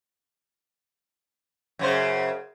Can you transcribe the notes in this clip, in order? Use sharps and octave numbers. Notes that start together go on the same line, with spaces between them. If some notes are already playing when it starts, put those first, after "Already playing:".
F#2 C#3 C5